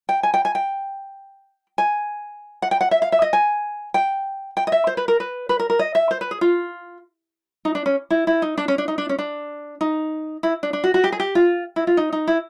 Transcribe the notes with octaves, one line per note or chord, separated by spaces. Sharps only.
G5
G#5
G5
G#5
G5
G#5
F#5
G5
F#5
E5
F5
E5
D#5
G#5
G5
G5
D#5
E5
C5
B4
A#4
B4
B4
A#4
A#4
D#5
E5
C5
B4
G#4
F4
D#4
D4
C#4
E4
E4
D#4
D4
C#4
D4
D#4
D4
C#4
D4
D#4
E4
D4
D4
F#4
F#4
G4
G#4
G4
F4
E4
F4
D#4
D#4
E4